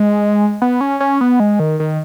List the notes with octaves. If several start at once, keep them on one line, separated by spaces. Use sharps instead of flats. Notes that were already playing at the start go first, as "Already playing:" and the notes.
Already playing: G#3
B3
C#4
C#4
B3
G#3
D#3
D#3